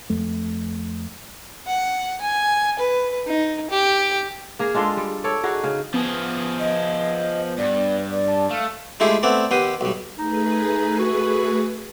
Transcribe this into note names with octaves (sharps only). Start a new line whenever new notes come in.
F2 A3
F#5
G#5
B4
D#4
G4
A#3 G#4 A#4
G#3 D4 F4 A4
G3
A4 C#5 D5
D4 D#4 F#4 G#4
C#3
F3 B3 G#4
D#5
G2 D5
D5
A5
A3 F5
G#3 A3 E4 F4 G4 G#4
A3 B3 C4 D5
D#2 B3 G4 C6 D#6
B1 G3
A3 D#4 G#4 B4
F#4